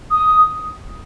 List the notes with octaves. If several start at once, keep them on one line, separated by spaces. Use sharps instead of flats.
D#6